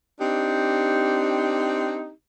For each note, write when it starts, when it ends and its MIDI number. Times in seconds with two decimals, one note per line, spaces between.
0.20 2.10 60
0.20 2.10 62
0.20 2.10 63
0.20 2.10 67